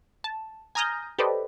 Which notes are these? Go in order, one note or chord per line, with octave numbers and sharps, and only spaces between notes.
A5
G#5 A#5 D#6 F6 G6 A#6
G4 A4 B4 C5 D5 D#5